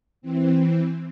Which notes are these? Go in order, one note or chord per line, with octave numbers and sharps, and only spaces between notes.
E3 C4